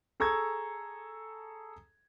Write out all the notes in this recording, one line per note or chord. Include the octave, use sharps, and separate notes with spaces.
G#4 A4 A#5 C#6 E6 G#6